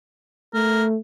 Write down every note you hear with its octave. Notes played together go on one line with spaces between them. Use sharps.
A3 A#4